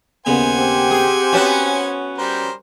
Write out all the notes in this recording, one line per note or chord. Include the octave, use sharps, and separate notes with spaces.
D#2 C#3 B3 C5 F#5 G#5
C4 G4
G#4
B3 C#4 F#4 B4 A5
G3 A#4 C5